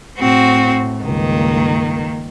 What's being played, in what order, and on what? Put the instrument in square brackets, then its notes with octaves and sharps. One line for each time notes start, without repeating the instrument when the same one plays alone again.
[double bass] A2 [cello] C4 F#4
[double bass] C#2 G2 [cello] D#3 A#3